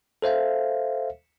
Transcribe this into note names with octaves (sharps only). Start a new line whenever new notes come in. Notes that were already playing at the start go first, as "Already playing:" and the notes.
A4 C5 E5 F5